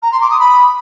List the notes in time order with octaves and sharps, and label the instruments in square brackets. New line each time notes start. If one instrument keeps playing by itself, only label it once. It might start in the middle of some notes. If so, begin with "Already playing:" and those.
[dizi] A#5
C6
D6
D#6
B5